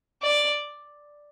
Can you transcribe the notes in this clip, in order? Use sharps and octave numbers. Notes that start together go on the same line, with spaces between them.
D5